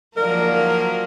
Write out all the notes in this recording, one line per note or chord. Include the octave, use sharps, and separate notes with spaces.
G#2 D3 F3 F#3 A#3 A#4 D5